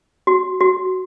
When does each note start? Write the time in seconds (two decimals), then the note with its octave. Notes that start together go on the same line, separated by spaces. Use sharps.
0.27 F#4
0.61 F#4